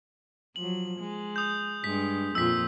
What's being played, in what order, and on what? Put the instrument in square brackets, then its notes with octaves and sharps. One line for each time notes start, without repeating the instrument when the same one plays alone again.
[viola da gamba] F3 F#3 [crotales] F#7
[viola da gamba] G#3
[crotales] D#6 G6
[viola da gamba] G2 G#3 [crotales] B6
[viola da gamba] F2 A#2 F4 [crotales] E6 B6